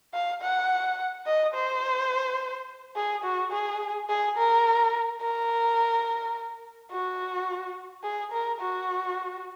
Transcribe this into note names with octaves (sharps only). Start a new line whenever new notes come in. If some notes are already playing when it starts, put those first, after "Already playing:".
F5
F#5
D#5
C5
G#4
F#4
G#4
G#4
A#4
A#4
F#4
G#4
A#4
F#4